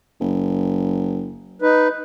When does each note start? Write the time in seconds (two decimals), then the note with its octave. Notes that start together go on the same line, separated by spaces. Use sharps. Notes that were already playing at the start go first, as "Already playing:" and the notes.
0.21 F#1
1.62 D#4 B4